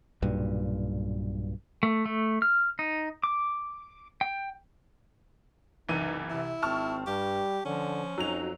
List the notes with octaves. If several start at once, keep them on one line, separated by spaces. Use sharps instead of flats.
B1 G2 A#2
A3
A3
F6
D#4
D6
G5
F#1 C2 E3 D#4 D#7
C3 E4
G#1 C4 A5 C#6 F6
G2 G3 G4
D3 F3 C#4
F2 F#3 D#4 F7